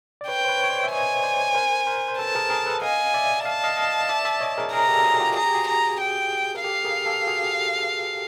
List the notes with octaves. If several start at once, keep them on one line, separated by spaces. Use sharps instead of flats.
D5
B4 C#5 G5
C5
B4 C#5
C#5
C5 D5
E5
C#5 D#5 G#5
C5 D5
A#4 C5
A#4 C5
C5
A4 B4 A5
G#4 A#4
G#4 A#4
A4 B4
D#5 F5 G#5
D5 E5
F5 A5
D#5 F5
D#5 F5
D5 E5
D5 E5
C#5 D#5
G#4 A#4
G#4 A#4 A#5
G4 A4
F#4 G#4
F4 G4
G#4 A#5
G4
F#4 G#4
A#5
G5
A#4
G4 A4 F5
G#4 A#4
G4 A4
F#4 G#4